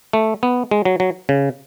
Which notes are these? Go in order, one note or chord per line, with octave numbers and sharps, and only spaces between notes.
A3
B3
G#3
F#3
F#3
C#3